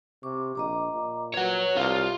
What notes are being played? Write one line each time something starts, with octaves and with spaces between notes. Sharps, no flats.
C3 C#6 D6
A#1 D#5 A#5 D6
A#2
B4 C#5 F#5
C2 F4